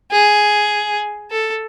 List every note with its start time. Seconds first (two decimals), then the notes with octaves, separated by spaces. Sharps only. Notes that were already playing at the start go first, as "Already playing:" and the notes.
0.12 G#4
1.31 A4